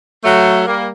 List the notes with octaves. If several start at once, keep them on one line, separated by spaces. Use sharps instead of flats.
F#3 A3
G3 A#3